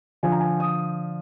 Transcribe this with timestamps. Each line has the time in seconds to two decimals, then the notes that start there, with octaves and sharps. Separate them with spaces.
0.23 D3 F3 G#5
0.32 A#5
0.40 G#5
0.60 D#6